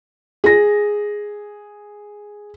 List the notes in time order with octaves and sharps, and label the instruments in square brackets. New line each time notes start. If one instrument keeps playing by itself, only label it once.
[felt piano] G#4 A#6